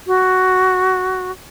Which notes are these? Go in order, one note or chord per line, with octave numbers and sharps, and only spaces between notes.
F#4